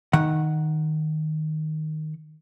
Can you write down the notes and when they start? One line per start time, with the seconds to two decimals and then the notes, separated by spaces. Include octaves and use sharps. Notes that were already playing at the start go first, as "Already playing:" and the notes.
0.13 D#3 F#5